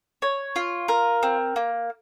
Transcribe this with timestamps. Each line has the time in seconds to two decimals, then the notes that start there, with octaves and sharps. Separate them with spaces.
0.22 C#5
0.56 F4
0.88 A#4
1.23 C4
1.56 A#3